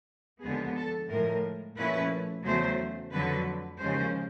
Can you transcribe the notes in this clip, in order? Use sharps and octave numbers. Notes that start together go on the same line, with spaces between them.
D#2 D3 F3 G#3 B3 G#4
A4
A2 F3 G#3 A#4
A#2 F3 A3 C#4 E4 B4
E2 C#3 F#3 A3 C5
F2 D3 F#3 B4
D#2 C#3 F3 G#3 C#4 C5